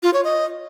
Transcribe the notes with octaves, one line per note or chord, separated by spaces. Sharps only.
F4
C#5
D#5